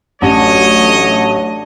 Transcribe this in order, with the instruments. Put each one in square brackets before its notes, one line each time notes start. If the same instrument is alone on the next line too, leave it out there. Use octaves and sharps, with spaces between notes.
[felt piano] A1 C#4 [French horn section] F#3 A3 [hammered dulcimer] D4 [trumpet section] C#5 D#5